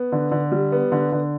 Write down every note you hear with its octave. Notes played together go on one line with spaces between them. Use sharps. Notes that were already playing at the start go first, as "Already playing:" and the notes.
Already playing: B3
D3
D3
G3
B3
D3
D3